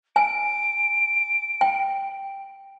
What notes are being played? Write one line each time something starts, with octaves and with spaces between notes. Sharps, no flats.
G#5 D7
G5